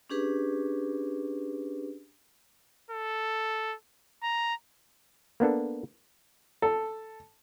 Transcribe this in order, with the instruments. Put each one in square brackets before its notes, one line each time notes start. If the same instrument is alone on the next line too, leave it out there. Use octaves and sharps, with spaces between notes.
[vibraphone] C#4 D4 G4 G#4 B4
[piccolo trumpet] A4
A#5
[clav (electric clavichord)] A#3 B3 D4 A4
[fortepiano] A4